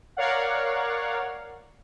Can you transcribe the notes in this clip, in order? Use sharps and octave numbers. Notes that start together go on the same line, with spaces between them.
A#4 C#5 D5 F5 F#5